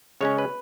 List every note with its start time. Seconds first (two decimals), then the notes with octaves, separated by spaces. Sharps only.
0.21 C#3 G#3 C#4 C#5
0.38 B4